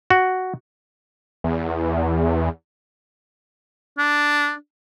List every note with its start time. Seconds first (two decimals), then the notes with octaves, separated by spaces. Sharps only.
0.10 F#4
1.44 E2
3.98 D4